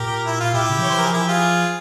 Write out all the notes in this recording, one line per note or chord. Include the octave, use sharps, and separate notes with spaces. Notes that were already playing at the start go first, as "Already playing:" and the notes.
Already playing: A#2 G4 A#4
E4
F4
A#2 E4 G4
C#3
F3
E3 C#5
C5
F3 A#4
G#4
E4 G4
F4 G#4